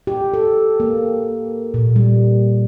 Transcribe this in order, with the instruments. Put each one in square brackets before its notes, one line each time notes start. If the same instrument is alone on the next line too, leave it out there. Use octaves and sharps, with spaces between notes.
[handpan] G4
A4
A#3
A#2
G3